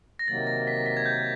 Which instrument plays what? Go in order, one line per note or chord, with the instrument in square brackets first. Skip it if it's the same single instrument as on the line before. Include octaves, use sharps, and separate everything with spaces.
[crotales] A#6
[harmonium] C3 D#3 F#3 A#3 [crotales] A6
[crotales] A#6
B6
B6
G#6
G6